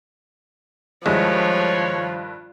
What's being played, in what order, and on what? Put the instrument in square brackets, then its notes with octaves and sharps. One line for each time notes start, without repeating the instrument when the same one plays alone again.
[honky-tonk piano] G2 D#3 E4 [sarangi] F3 [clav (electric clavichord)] G#3 [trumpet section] C#5